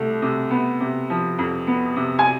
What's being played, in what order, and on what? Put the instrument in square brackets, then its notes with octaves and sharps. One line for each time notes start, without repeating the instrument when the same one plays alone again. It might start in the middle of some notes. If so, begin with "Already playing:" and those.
Already playing: [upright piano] C2 A3
C3
B3
C3
F3
F2
B3
C3
G#5